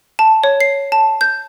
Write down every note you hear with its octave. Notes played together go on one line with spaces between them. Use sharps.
A5
C#5
C7
A5
G6